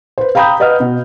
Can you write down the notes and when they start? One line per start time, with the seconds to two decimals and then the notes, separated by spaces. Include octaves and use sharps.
0.18 B4 C5
0.35 F5 G5 A#5 B5 D#6 G6
0.60 B4 D#5 F#5 D#6 F6
0.80 B2